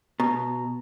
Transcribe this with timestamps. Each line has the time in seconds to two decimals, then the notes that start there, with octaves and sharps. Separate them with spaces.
0.20 B2 A#5